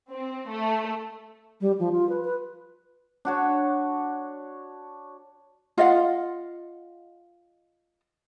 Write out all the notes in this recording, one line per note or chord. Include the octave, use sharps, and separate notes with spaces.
C4
A3
G3
F3
F4
B4
B4
D4 F#4 C#5
F4 D#5 F5 F#5